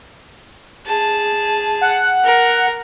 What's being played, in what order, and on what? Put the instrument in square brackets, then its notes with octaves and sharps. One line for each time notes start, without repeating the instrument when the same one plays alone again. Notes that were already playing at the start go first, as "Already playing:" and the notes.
[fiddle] G#4 A5
[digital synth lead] F#5
[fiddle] A#4